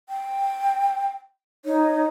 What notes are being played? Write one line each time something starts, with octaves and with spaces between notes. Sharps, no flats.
G5
D#4 C#5